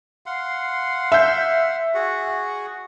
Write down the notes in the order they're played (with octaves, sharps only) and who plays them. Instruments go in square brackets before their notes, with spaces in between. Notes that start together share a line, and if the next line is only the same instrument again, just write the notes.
[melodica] F5 F#5 C6
[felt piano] E5 G6
[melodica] F#4 G#4 F#5